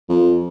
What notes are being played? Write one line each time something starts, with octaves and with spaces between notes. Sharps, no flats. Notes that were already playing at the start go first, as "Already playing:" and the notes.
F2